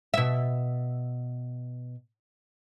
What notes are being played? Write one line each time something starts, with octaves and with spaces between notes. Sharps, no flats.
B2 E5